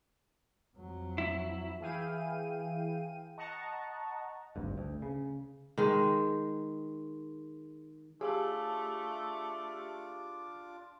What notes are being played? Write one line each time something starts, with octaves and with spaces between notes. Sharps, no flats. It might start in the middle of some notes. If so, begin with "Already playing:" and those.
F2 F#3
E4
E3 E4 G#4 F5 G5 D#7
D#5 F#5 A5 A#5 C#6
G#1 D2 G2
D2
C#3
D#3 G#3
A3 D4 F4 G4 G#4 F5 A5 D6